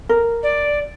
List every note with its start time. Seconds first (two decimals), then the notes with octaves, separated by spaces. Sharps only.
0.09 A#4
0.42 D5